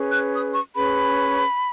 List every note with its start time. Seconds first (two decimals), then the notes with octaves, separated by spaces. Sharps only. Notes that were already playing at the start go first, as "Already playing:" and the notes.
Already playing: C#4 G#4 B4
0.11 F#6
0.33 D#6
0.53 C#6
0.75 C#4 G#4 B4 B5